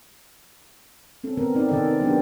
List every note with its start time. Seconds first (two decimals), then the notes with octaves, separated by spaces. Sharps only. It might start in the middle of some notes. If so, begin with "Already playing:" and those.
1.24 C4 C#4 A4
1.37 D#3 B3 C4 A#4
1.55 C4 D#4 D5
1.69 C3 D#3 C#4 A4 D5
1.84 C4
2.00 F#3 B3 D4 G4